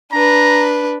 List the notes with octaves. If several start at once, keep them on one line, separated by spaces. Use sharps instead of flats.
D4 B4 A#5